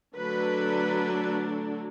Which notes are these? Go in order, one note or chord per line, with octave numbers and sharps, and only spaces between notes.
D3 F#3 A3 D4 B4